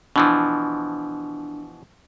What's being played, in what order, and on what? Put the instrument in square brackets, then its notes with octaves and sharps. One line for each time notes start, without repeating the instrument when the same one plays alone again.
[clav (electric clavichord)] B2 E3 F3 [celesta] D4